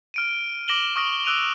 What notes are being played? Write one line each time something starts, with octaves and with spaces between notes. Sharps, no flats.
F6 D7 D#7
D6 A#6 D7 E7 F#7 G7
C#6 D#6 F6 A#6 D7 F#7
D6 E6 F#6 D7 D#7 F7